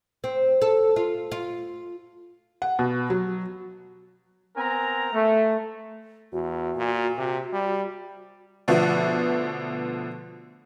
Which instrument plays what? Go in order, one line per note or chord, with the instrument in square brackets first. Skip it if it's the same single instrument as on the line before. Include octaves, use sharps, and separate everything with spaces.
[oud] C4
A4
F4
F4
[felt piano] F#5
B2
F#3
[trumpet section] B3 C4 A#4 G#5 A#5
A3
[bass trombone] E2 [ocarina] F#4
[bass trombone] A#2
C3
G3
[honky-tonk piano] B2 D3 F3 A3 B3